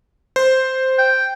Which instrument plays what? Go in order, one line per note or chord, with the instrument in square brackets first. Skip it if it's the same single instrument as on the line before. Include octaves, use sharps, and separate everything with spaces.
[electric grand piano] C5
[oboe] G5